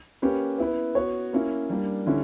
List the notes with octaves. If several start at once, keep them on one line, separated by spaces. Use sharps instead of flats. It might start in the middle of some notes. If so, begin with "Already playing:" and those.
A#3 C#4 G4 B4
B3 E4 B4
B3 F#4 C#5
A#3 C#4 E4
G3 A#3 D4
D3 G3 C#4 E4